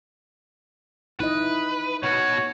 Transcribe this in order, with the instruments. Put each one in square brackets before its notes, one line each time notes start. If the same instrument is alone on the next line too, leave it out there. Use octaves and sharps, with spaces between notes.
[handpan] D#4 E4 D#5 [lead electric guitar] B4
[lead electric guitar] B2 F#4 [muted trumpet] C#5